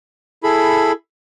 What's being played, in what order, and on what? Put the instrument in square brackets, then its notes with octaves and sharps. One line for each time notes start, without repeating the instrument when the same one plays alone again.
[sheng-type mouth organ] E4 G#4 A4 B5